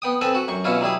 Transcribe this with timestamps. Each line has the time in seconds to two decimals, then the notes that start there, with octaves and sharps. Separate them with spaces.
0.02 B3 G5 D#6
0.21 C4 A4 B4 G#5
0.35 F#4
0.48 F#2 C#6
0.64 B2 C#4 E4 F4
0.81 F#3 G3 E4 G#4